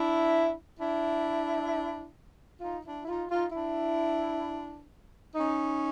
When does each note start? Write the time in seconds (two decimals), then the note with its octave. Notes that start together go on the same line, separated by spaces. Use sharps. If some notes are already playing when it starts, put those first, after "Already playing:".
Already playing: D4 E4
0.78 D4 E4
2.61 D#4 F4
2.84 D4 E4
3.02 E4
3.06 D#4 F4
3.30 D#4 F4
3.52 D4 E4
5.35 C#4 D#4